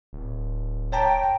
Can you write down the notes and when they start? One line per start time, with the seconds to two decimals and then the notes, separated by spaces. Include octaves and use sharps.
0.13 D1
0.92 C#5 G5 A5 A#5